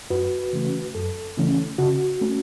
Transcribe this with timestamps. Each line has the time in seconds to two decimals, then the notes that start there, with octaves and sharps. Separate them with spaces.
0.10 F#2 F#4 B4
0.53 C#3 E3 A3 C#4
0.95 F#2 A4
1.37 C#3 E3 A3 C#4
1.78 C#3 F#4
2.21 A3 C#4